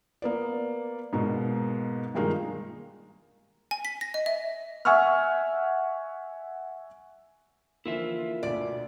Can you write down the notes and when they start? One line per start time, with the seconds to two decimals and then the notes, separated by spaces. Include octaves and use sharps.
0.22 A#3 B3 D5
1.13 G#2 B2 A#3
2.15 G2 D#3 G#3 A#3 D#4 F4
3.71 G#5
3.85 B6
4.01 A#6
4.14 D#5
4.26 E5
4.85 E5 F#5 G#5 C#6 E6 F6
7.86 D3 E3 F3 A#3 E4 F4 E5
8.43 D2 B2 D5